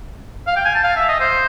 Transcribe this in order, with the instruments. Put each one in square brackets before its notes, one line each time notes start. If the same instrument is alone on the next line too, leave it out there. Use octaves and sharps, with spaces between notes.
[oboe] F5
G5
G#5
A5
F5
E5
D#5
C5